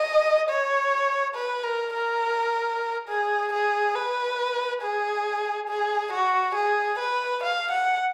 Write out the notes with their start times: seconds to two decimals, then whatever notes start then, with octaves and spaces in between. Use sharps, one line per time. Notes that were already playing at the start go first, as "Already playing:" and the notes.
Already playing: D#5
0.49 C#5
1.35 B4
1.64 A#4
1.93 A#4
3.08 G#4
3.53 G#4
3.95 B4
4.82 G#4
5.69 G#4
6.13 F#4
6.55 G#4
6.99 B4
7.43 F5
7.71 F#5